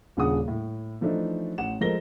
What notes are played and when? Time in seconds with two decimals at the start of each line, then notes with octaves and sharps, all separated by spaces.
0.17 D#1 C#3 D4 G#4 F#5 D#6
0.48 A2
1.01 E3 F3 A3 D4 D#4
1.58 A1 F#5 E7
1.81 F3 G#3 A4 A#4 A#6 G7